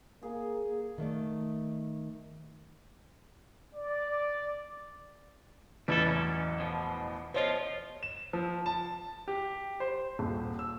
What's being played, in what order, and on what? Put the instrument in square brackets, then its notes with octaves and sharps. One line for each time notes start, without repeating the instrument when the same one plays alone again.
[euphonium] A#3 [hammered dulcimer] G#4
[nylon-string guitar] D#3 A3 D5
[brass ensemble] D5
[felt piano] A1 E2 B4 [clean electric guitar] G3 E4 A4
[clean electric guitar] F#2 C#4
B2 F3
[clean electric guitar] E2 F3 F4 [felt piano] C5 C#5 D#5
[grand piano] E7
F3
A5
G4
C5
D#1
E6